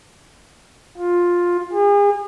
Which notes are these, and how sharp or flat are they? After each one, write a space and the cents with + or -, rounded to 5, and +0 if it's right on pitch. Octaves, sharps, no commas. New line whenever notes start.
F4 +10
G#4 -40